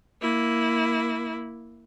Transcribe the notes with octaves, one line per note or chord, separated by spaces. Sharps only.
A#3 E4